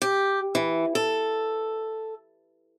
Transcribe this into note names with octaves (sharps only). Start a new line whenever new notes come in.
G4
E3
A4